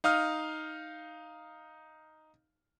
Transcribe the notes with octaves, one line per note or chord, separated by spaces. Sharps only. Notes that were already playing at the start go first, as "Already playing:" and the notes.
D#4 F5 D#6 F6